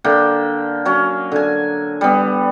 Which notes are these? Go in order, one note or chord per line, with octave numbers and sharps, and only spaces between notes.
D3 A#3 G5
F#3 C#4
D3 G#5
G3 B3